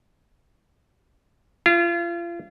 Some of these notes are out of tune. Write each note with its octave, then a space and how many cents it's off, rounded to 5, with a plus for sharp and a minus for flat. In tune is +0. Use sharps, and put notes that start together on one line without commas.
F4 -35